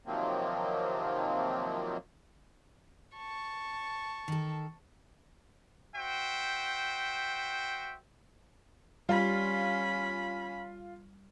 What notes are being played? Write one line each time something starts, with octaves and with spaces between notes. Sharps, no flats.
C3 D#3 F3 F#3 A#3 C4
A5 C#6
D#3 A4
F#4 C5 E5 G5
G3 C#4 F4 B5